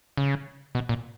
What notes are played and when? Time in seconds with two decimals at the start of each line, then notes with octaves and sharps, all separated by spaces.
0.17 C#3
0.75 B2
0.89 A#2